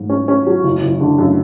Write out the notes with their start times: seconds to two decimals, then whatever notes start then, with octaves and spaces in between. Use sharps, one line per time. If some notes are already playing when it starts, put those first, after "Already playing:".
Already playing: G#2
0.09 C#4
0.28 C#4
0.47 F#3
0.64 F#1
0.83 F#1
1.00 D3
1.18 F#2